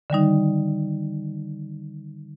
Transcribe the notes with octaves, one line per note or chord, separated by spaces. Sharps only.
D3 D#3 G3 D#4